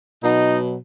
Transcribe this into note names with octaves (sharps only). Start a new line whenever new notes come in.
B2 F#3 D#4